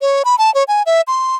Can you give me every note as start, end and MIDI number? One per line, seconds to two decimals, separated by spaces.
0.01 0.23 73
0.25 0.35 83
0.38 0.53 81
0.54 0.64 73
0.68 0.82 80
0.86 1.01 76
1.07 1.36 84